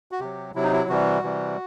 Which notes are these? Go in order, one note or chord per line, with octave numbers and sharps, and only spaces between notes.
F#4
C3 F#3 G4
C3 F#3 E4
D#4
E4
C3 E3 G3 F#4
C3 E3 G3